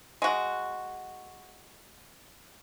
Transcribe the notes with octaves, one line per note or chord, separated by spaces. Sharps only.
G#3 F#4